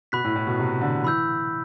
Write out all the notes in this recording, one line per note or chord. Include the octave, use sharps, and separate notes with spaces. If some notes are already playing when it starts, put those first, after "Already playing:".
B2 B5 F#6 B6
A2
A2
B2
C3
D3
E3 B5 E6 G6